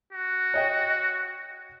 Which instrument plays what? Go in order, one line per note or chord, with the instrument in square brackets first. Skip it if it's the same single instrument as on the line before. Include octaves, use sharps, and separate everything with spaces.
[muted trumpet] F#4
[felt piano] C#5 D#5 G5